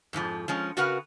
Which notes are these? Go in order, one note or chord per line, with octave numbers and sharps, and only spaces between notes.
F2 G#2 E3 F3
F3 G#3 C#4
C#3 F#4 A#4 B4 F#5